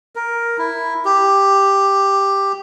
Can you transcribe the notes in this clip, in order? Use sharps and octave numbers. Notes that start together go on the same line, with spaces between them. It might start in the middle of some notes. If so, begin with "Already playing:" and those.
A#4
E4
G4